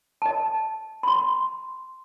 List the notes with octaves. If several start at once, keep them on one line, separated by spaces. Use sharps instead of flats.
D#5 A5
B5 C6